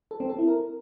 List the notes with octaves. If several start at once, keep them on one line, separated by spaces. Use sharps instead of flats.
A4
C4
A4
E4
A#4